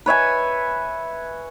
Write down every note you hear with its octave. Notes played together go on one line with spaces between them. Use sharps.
B4 C#5 E5 G#5